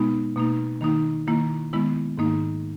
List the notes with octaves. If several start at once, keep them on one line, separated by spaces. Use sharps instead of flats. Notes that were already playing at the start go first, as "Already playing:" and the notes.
Already playing: B2 G#3 B3 D#4
B2 A#3 D#4
D#3 A#3 D#4
D#3 A#3 E4
D#3 G#3 B3 E4
G#2 D#3 A#3 D#4